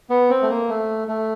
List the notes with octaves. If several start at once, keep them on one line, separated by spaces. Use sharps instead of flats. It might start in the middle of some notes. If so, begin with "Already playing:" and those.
B3
C4
A3
A#3
A3
A3